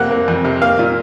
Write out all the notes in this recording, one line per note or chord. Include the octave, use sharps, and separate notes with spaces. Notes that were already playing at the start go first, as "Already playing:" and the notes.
Already playing: F2 C3 A#3 F#5
A#3
F2
C3
A#3 F5
A#2